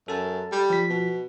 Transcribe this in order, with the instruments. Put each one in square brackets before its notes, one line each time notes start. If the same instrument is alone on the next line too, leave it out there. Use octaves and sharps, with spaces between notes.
[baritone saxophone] F#2 [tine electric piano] A4 A5
[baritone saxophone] G3
[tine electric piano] F3 B6
[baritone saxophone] B2